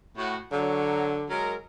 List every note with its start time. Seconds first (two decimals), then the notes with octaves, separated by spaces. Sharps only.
0.17 A2 F#4
0.52 D3 F#3
1.30 F#3 G#3 A#4